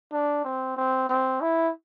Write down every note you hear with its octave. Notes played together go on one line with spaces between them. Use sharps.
D4
C4
C4
C4
E4